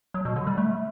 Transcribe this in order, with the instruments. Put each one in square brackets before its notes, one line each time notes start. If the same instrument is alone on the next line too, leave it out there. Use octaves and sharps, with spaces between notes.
[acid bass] F#3
B2
D3
G3
A3